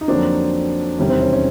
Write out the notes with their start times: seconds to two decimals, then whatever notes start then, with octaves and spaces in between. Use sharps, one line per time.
0.01 D#4
0.08 F2 D3 F#3 A#3 C4 D4
0.99 E1 E2 C3 D#3 G3 C#4
1.10 C4
1.21 C#4
1.33 C#4